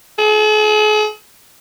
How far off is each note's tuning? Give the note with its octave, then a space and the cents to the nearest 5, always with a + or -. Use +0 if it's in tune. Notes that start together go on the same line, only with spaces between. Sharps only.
G#4 +45